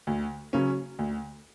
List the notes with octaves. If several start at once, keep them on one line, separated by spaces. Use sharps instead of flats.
D2
C#3 F#3 C#4
D2